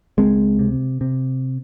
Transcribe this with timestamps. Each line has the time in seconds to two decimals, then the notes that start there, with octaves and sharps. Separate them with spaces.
0.18 C#2 G#3 C4
0.59 C3
1.01 C3